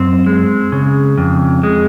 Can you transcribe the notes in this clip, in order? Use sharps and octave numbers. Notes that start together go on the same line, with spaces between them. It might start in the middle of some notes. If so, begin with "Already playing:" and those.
Already playing: F#2 C4
G#3
C#3
F2
G#3